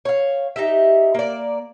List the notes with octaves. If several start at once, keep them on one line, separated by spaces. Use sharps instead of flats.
C#5 F5
D#4 G4 E5
A#3 D5